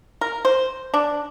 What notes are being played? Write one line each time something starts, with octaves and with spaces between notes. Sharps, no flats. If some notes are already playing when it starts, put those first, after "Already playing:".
A#4
C5
D4